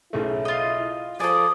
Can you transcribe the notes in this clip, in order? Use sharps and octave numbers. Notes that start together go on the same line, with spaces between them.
B1 C#3 A3 E4
F4 D#5
F3 A4 D5 G#5 D#6